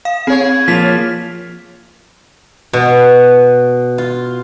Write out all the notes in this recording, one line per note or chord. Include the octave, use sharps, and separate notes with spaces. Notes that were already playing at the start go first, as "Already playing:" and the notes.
F5
C4 G#4 C#5
F3 A#3 F4 B6
B2
F4